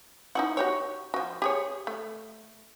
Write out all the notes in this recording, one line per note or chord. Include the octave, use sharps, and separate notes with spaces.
D#4 E4 F#4
F#4 G4 C#5
F3 F#4
G4 G#4 C#5
A3